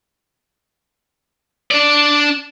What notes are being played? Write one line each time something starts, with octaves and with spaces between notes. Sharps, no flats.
D4 D5